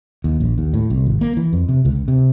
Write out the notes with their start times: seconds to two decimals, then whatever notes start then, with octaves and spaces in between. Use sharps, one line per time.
0.24 D#2
0.40 A#1
0.58 D#2
0.74 A2
0.90 C2
1.06 G#1
1.21 A#3
1.37 E3
1.53 F2
1.69 C3
1.85 C#2
2.08 C3